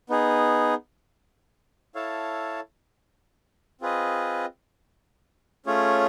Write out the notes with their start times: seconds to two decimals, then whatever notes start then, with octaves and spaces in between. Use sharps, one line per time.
0.10 B3 D#4 G#4
1.95 E4 A4 C#5 F5 A5
3.81 C4 F4 G#4 B4 D#5
5.66 A3 C#4 F4 G#4 C#5